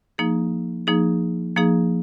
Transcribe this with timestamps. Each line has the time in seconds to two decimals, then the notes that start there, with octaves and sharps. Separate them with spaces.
0.18 F3 A#3 D#4 G#4
0.87 F3 A#3 D#4 G#4
1.56 F3 A#3 D#4 G#4